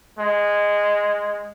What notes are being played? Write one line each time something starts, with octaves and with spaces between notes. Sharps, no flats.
G#3